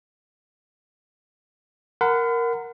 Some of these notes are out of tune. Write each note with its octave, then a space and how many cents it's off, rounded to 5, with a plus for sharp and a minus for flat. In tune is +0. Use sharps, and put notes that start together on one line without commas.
A#4 +0 F#5 +0 B5 +45